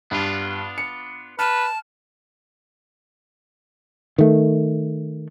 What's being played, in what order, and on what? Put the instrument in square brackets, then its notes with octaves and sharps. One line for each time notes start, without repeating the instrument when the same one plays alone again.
[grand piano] G2 [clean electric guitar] B3 D4 F4
[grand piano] C#7
[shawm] B4 [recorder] A5 [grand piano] F6
[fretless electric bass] D#3 A3